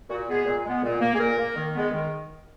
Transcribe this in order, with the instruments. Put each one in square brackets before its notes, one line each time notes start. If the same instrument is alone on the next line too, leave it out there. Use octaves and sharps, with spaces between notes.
[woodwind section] A#2 F#4
G#3 B3 G#4
A#2
G#3 B3
A#2
A#3
G#4
A#2 A#4
A#3
D#3
G#3 B3
D#3